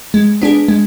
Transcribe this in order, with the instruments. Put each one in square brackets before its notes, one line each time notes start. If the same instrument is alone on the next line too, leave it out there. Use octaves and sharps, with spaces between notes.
[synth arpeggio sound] G#3
B3 D4 G#4
G#3